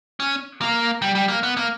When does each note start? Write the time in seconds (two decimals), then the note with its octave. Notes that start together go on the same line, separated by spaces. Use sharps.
0.20 C#4
0.61 A#3
1.02 G3
1.15 G3
1.28 A#3
1.43 B3
1.57 A#3